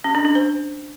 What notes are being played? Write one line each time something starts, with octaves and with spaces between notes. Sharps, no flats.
C#4
D4
D4
C5